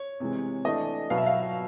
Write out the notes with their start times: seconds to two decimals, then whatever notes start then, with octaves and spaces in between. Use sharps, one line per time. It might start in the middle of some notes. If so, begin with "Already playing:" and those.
Already playing: C#5
0.20 C3 E3 G#3
0.65 E3 A3 D4 D#5
1.10 B2 F#3 B3 F5
1.18 E5
1.26 F5